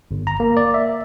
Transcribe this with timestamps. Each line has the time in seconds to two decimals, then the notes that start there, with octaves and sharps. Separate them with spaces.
0.11 G1
0.27 A#5
0.40 A#3
0.57 D5
0.74 E5